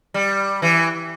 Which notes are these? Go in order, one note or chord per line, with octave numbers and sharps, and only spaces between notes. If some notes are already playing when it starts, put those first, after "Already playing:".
G3
E3